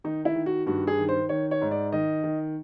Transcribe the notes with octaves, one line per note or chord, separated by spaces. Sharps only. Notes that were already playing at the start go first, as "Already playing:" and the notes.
D#3 D#4
E4
D#3
F#4
G2 F#4
G#4
D#3
C5
D#3 C#5
C#5
G#2
D5
D#3 D#5
D#3